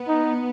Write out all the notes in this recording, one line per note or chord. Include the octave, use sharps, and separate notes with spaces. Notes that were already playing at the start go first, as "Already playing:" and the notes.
Already playing: B3
D#4